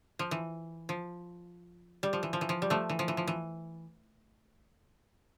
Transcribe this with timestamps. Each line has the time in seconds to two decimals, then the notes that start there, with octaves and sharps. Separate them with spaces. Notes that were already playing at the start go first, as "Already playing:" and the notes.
0.19 F3
0.31 E3
0.89 F3
2.03 G3
2.13 F3
2.23 E3
2.33 F3
2.41 E3
2.49 F3
2.62 G3
2.70 F3 A3
2.89 E3
2.99 F3
3.08 E3
3.17 F3
3.27 E3